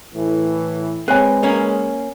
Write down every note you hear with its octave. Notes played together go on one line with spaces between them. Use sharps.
A2 E3
G#3 C4 B4 C#5 G#5
A#3 C#4